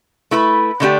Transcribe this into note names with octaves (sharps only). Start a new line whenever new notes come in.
A3 E4 B4
D3 A3 D4 G4